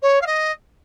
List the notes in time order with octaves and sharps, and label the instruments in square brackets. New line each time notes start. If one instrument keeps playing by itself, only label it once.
[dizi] C#5
F5
D#5